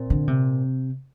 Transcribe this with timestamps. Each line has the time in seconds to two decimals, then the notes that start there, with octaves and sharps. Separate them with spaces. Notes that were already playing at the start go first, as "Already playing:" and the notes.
Already playing: A#2 C4
0.10 D3
0.28 C3